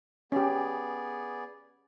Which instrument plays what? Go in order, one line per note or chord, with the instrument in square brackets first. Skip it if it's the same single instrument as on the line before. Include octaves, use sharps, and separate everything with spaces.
[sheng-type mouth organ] B3 G#4 D5 [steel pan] C#4 G4